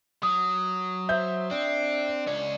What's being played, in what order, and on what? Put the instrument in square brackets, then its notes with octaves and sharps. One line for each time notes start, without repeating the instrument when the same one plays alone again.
[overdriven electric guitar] F#3 [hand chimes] D#6
[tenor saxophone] C5 [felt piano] E5 G6
[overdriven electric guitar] C4 [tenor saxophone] D4
[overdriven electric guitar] C#2 C#4 [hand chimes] D5